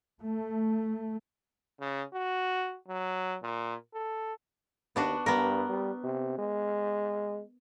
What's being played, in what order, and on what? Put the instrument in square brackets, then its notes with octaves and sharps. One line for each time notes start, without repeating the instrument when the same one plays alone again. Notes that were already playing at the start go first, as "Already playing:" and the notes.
[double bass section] A3
[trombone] C#3
F#4
F#3
A#2
A4
[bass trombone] D#2 [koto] B3 D4 F#4
[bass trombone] G2 [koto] B3 A#4
[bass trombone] G3
C3
G#3